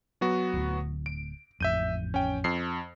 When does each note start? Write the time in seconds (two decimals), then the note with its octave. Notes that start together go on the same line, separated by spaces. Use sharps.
0.21 F#3 B3 F#4
0.53 D1 D2
1.06 D7
1.60 A1 F2 E5 G6 D#7
2.14 C#4 G5
2.44 F2 C7